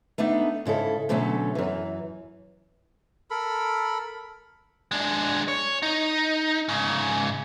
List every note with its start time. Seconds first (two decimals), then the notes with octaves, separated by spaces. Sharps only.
0.18 A3 B3 D4 D#4
0.65 G#2 C#3 E4 A4
1.09 B2 D3 F#3 A3 C#4
1.55 F#2 E3
3.30 A4 A#4 B5
4.91 G#3 D4
5.48 C#5
5.83 D#4
6.69 G#2 C#3